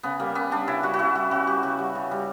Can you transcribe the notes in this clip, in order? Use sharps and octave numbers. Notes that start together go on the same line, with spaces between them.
C#3 B3
G3 A#3
C#3 B3
G3 D4
C#3 E4
G3 F#4
F#4
C#3 E4
G3 F#4
C#3 F#4
G3 G4
C#3 F#4
G3
C#3
G3